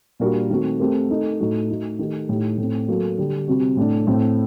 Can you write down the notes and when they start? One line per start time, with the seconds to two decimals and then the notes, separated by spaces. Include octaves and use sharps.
0.20 A#2 G3 D4 F#4 A#4
0.50 D#3 A3 C4 F#4
0.80 A3 C4 G4 A#4
1.09 A3 D#4 A4
1.40 A2 A3 D#4 F#4
1.70 A3 D#4 F#4
1.99 D#3 A3 D#4 G4
2.29 A2 A3 D#4 G4
2.58 A2 A3 C4
2.88 F#3 A#3 F#4 A4
3.18 D3 G3 D4 G4
3.47 C3 G3 C4 F#4
3.77 A2 A3 D4
4.07 A2 A3 C4